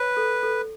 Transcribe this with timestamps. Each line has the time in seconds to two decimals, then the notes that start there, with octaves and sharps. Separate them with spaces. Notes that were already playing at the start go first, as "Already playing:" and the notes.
Already playing: B4 C#5
0.17 A4
0.43 A4